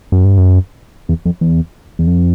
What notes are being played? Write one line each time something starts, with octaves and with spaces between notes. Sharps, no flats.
F#2
G2
F#2
E2
F2
E2
E2
F2